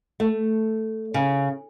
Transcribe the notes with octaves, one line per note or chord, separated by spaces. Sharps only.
A3
C#3